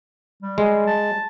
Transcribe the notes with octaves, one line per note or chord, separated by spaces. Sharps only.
G3
G#3
A5